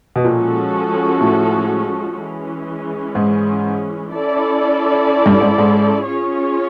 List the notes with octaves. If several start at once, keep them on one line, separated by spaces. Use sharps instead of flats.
B2
A#2 F3 G#3 C#4 F#4 A4
A2
E3 G#3 C#4
G#2
C#4 E4 A4 D5
G2
G#2
G#2
C#4 F4 G#4 C#5